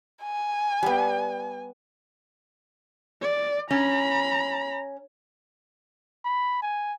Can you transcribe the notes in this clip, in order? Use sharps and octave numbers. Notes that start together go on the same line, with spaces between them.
G#5
G3 B3
D5
C#4 A#5 B5
B5
G#5